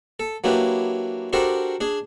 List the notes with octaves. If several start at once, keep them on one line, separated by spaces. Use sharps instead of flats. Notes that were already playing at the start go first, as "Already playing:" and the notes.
A4
F#3 A#3 D4 E4 G4 B4
D4 F#4 G4 A4 A#4 C5
D4 G#4